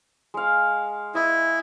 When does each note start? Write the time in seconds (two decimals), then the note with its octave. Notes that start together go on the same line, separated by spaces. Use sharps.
0.34 G#3 F5
1.15 E4 D#5